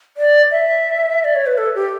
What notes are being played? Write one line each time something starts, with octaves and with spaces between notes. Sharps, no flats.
D5
E5
D5
C#5
B4
A4
G4